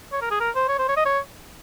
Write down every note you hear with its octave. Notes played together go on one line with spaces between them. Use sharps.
C#5
A#4
G#4
A#4
C5
C#5
C5
C#5
D#5
C#5